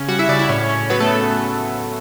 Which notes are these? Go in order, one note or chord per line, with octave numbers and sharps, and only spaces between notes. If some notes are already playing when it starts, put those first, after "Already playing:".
Already playing: C#3 C#4
G3 F#4 F#5
E4 E5
C#3 D5
E4 E5
A2 C#4 C#5
C#4
F#3 B3 B4
A3 A4